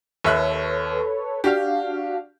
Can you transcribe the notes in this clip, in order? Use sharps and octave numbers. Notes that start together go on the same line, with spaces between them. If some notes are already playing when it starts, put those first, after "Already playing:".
D#2 A4 B4 C#5 E5 F#6
D4 F#4 G4 F5